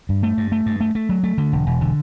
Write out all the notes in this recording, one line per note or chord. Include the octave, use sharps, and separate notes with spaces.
G2
A3
G2
A3
G2
A3
A3
F#3
A3
D3
E1
E1
D3